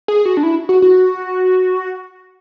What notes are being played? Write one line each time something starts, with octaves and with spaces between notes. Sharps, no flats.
G#4
F#4
D4
E4
F#4
F#4